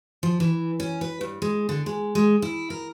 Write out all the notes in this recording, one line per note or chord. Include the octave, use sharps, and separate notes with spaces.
F3
E3
C#4
B4
G2
G#3
D3
G#3
G#3
E4
A#4